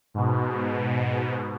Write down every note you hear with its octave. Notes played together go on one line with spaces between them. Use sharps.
G#2 B2